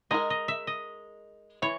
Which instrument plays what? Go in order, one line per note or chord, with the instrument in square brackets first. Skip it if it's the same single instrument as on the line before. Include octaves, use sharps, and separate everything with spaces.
[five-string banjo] G#3 D#4 A#4 [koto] D#5
[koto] D#5
E5
D#5
[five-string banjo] E3 [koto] C#5